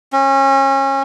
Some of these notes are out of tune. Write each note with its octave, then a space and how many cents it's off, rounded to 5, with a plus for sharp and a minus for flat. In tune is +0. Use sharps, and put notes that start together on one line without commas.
C#4 -30